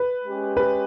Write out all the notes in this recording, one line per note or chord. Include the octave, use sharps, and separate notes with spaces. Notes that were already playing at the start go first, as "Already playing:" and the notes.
Already playing: B4
G#3 C#4 G4
B4